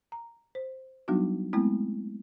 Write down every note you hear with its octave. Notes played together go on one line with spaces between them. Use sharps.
A#5
C5
F#3 G3 B3 D4 D#4 F#4
G#3 A3 B3 C4 E4